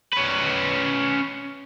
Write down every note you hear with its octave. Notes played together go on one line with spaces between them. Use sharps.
C#4 B4